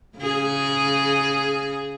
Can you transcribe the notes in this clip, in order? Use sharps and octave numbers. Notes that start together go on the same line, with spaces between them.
C#3 G#4